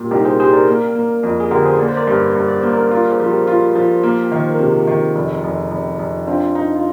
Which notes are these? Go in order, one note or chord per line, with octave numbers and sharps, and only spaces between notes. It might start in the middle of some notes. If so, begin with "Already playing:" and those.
Already playing: A#2 G3 G4 A#4
C2 D#4 G4
G#4 C5
G3 G#4 C5
A#4 D5
A#3
A#3
F2
G#4
D3 G4 A#4
G#4 C5
A#3 D5
C5
A#4 D5
G2
G2
D5
A#3 C5
A#4 D5
F4 A#4 D5
G#4 C5
F3
G4 A#4
F4
F3
A#3
D#3
C5
A#4
C3 F4 G#4
D#3
F1
F1
F1
F1
C4 D4 F4
D#4
F4